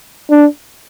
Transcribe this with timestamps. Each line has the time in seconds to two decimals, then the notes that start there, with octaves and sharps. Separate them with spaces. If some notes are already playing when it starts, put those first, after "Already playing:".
0.30 D4